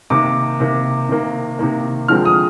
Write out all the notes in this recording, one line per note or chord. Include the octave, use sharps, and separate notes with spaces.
C3 D#3 A#3 D6
C3 D#3 A#3
C3 D#3 A#3
C3 D#3 A#3
D3 F3 G#3 C4 F6
D#6